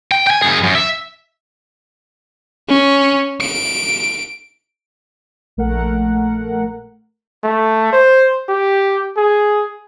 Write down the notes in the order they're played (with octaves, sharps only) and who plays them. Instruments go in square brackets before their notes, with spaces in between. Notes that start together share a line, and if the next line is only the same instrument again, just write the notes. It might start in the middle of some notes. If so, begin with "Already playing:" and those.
[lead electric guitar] G5
G5 G#5
F#2 G#4
F#2
E5
[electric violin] C#4
D7
[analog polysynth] A#1 A3 A#4 F#5
[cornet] A3
C5
G4
G#4